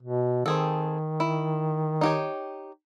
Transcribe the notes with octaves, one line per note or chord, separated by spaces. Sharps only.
B2
D#3 C4 G#4 A4
E4
D#4 G4 C#5